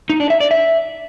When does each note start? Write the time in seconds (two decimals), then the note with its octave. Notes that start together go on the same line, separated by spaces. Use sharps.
0.10 D#4
0.20 D4
0.30 E5
0.40 D5
0.51 E5